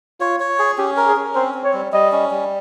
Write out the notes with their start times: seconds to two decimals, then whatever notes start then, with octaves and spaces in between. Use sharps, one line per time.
0.21 F4 C#5
0.40 C#5
0.59 G#4
0.78 C#4 G4
0.97 A#4
1.07 G#4
1.16 C#4
1.35 C4 C5
1.54 C4
1.64 C#5
1.73 G3
1.93 G3 D#5
2.12 C#4
2.31 G3